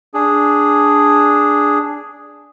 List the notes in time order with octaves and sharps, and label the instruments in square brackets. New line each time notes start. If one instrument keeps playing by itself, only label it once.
[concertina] D4 G#4